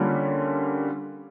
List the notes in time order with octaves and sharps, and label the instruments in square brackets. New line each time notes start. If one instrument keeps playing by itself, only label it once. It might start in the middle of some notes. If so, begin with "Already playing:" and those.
Already playing: [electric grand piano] D3 G3 A#3 C#4 F4